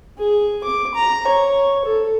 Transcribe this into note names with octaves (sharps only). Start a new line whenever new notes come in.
G#4
D6
A#5
C#5
A4